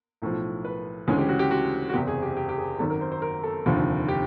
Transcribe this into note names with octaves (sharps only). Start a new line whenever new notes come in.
B1 A2 F3
B4
D2 C#3 E3 G#3 C#4 G#4
G4
F#4
G4
F#4
F#4
F#1 E2 C3 G4
G#4
G4
G4
G4
G#4
G#1 F#2 D#3 F#3 A4
A#4
C5
C5
A#4
A4
F1 D#2 D3 F3
G4